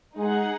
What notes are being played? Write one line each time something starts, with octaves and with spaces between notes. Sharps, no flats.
G#3 D#4 G#4 F#5